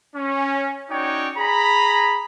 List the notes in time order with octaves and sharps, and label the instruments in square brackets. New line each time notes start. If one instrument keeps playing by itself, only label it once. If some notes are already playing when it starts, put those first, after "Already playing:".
[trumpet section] C#4
C#4 D#4 F#4 C#5 D5 G5
G#4 A#5 B5